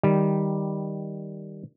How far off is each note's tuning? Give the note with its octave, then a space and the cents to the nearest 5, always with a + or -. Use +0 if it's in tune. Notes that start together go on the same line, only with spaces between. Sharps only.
D#3 +0 G3 +0